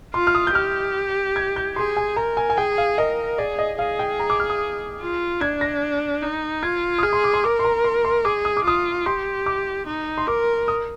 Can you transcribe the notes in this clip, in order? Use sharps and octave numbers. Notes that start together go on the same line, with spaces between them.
F4 C6
F6
D#6
G6
G4 F6
G#6
G6
G#4 C6
G#5
A#4 A#5
G#5
G#5
G#4 G5
F5
A#4 D#5
G#4 D5
D#5
G#4 F5
G5
A#5
D6
F6
D#6
F4
D4 G#6
A#6
D#4
F4 G#6
D#6
G#4 F6
C6
D6
C6
A#4 D6
C6
A#5
C6
C6
G#4 D6
D#6
D6
F4 D#6
G4 C6
D6
D#4
C6
A#4 D6
D#6